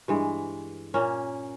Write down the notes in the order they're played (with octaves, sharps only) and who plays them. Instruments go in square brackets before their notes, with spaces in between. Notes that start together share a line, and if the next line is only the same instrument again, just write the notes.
[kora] G2 E3 G#3
A#2 A#3 C#4